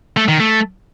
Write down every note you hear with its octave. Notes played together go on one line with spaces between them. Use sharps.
A3
D#3
A3